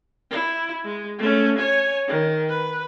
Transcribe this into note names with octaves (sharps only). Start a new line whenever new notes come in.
E4
G#3
A3 C#4
C#5 G#5
D#3
B4